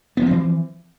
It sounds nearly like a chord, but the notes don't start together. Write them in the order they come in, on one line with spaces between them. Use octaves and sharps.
B3 F3 C4 E3